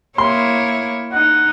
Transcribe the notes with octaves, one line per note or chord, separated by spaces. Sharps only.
A#3 E4 C#5 C6
D#4 F#5